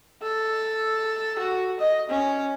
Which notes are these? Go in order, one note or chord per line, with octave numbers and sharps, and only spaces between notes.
A4
F#4
D#5
C#4